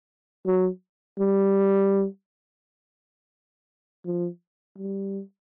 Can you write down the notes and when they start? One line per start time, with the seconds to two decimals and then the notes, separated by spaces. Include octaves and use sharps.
0.46 F#3
1.19 G3
4.06 F3
4.78 G3